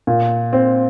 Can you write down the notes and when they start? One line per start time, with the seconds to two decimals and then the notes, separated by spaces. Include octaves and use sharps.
0.07 A#2
0.53 C4